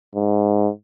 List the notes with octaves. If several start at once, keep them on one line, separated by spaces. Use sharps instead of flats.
G#2